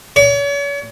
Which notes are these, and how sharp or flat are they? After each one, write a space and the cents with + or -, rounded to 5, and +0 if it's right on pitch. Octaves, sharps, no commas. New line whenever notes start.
C#5 +40